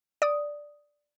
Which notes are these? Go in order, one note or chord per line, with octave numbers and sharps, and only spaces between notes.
D5 D#6